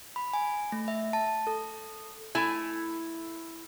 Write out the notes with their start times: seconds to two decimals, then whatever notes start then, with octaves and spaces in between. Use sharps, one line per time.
0.16 B5
0.33 G#5
0.72 A3
0.88 E5
1.13 A5
1.47 A4
2.35 A3 E4 G#5